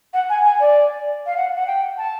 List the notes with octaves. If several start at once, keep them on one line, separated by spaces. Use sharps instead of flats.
F#5
G#5
G#5
D5
F5
F#5
F#5
G5
A5